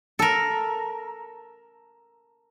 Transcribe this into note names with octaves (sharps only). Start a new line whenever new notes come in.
A4 A#4